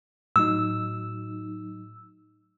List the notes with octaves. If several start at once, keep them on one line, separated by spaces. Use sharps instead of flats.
A2 F#3 D#4 E6